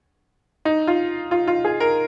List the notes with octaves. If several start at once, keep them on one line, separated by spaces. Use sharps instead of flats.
D#4
F4
F4
F4
G#4
A#4